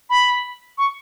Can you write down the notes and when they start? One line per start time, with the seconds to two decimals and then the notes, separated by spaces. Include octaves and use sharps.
0.10 B5
0.78 C#6